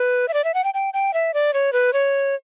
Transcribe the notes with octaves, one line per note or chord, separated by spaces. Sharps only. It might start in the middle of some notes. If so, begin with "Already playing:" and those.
Already playing: B4
E5
D5
E5
F#5
G5
G5
G5
E5
D5
C#5
B4
C#5